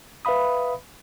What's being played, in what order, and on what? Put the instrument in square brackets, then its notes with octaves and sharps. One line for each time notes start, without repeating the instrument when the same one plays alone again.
[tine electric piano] B4 E5 F5 B5 D#6